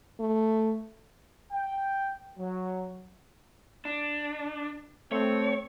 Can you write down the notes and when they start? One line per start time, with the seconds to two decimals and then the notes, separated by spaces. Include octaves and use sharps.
0.20 A3
1.53 G5
2.39 F#3
3.85 D4
5.12 A3 C4 C#5